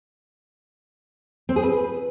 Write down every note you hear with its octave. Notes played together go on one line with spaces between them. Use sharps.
C4
G#4
B4